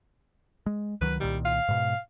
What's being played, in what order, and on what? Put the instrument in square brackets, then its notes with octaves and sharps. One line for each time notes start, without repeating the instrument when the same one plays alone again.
[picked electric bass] G#3
[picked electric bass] C#2 D#3 F#3 [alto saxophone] B4
[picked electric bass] C2 A#2 D#3 [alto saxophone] G3
[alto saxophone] F5
[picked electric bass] G#2 B2